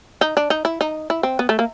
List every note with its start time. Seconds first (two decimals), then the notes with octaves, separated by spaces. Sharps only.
0.21 D#4
0.37 D4
0.50 D#4
0.65 E4
0.81 D#4
1.10 E4
1.23 C4
1.39 B3
1.49 A3
1.59 A#3